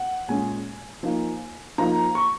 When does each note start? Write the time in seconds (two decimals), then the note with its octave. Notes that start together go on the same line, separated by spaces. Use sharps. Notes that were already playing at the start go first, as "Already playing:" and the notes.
Already playing: F#5
0.28 A#2 G#3 C#4 G#5
1.03 F3 A#3 D#4
1.78 F3 A#3 D#4 A#5
2.15 C#6